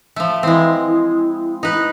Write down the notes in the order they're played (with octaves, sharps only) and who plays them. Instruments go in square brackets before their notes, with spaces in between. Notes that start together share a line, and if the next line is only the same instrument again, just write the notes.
[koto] F3 A3
[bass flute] E3 [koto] G#3 C4
[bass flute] E4
[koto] D#4 B4